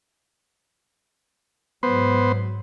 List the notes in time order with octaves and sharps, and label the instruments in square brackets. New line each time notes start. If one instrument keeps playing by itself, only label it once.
[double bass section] G#2 F#3 [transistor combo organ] B3 C5